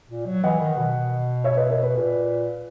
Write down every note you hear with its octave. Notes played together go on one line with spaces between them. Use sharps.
A#2
F#3
E3 D#5 F#5
D#3
B2
C#5 E5
B4 D#5
A#4 C#5
B4
A#2 B4